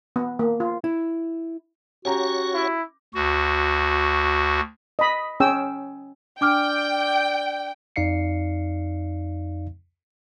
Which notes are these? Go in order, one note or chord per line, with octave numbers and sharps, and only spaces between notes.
B3
A#3
F4
E4
C#4 F#4 G4 C#5 F#5 A#5
E4
D2 F#4
D#5 B5
C#4 G#4 G5 E6
D4 D5 G5 D6 F6
F2 D#4 D5 F5 C7 C#7